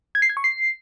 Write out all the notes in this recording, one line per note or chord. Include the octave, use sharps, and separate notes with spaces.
G#6
C7
G#6
C#6
C7